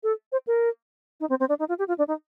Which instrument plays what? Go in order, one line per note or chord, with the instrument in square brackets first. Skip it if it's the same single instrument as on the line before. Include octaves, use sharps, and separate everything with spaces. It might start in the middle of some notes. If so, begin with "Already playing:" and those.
[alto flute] A4
C5
A#4
D#4
C4
C4
D4
D#4
F4
G4
F4
D4
D#4